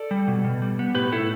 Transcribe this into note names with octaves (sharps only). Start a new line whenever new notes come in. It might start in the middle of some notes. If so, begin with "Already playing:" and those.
Already playing: A4 D5
G3
B2
B2
G3
B3
A2 G4 B4
A2 E4 A4